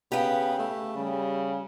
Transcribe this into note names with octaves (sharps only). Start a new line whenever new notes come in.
C#3 B3 G4 F5 G5
A3
C#3 G3